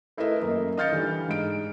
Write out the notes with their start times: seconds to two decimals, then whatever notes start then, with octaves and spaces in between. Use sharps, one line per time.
0.17 A3 E4 A#4 B4 D#5 E5
0.40 F#2 A#3 D#5
0.77 D#5 F5 F6 G6 A6 C#7
0.92 D3 E3 G3
1.29 G#2 D7